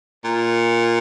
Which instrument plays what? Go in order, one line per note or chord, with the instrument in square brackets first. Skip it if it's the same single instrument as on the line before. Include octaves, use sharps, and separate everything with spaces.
[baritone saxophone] A#2